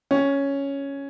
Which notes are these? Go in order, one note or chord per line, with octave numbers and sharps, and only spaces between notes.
C#4